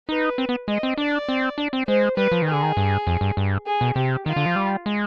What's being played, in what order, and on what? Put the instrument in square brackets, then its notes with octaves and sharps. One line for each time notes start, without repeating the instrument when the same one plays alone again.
[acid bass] D#4 [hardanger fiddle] B4
[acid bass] C4
B3
[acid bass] G#3 [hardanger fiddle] D#5
[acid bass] C4
[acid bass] D4 [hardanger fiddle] D5
[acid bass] C4
D4
C4
[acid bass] G#3 [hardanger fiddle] C5
[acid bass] G3 [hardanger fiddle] B4
[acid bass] F3
D#3
[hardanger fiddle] G#4
[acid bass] D3
D#3
G2
F2
G2
G2
[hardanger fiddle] G#4
[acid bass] B2
[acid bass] C3 [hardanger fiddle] G4
[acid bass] D#3 [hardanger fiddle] F4
[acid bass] D3
F3
G3
G#3